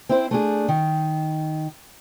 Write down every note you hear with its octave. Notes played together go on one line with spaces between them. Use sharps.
C4 E4 C5
A3 D4 G#4
D#3